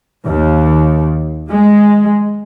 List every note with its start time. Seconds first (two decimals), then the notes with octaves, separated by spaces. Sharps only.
0.25 D#2
1.50 G#3